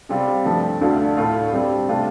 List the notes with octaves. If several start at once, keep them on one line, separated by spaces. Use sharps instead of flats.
C3 G3 C4 F4
G2 F3 A3
D2 D3 A3 D4 F4
A2 A3 F4
G2 G3 C4
C3 A3 D4 F4